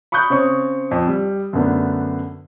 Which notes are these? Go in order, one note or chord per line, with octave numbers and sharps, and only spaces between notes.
B5 C#6 D#6 F#6 G6
C#3 C4 C#5 C#6 D#6
F2
G3
F#2 D3 A3 B3 D4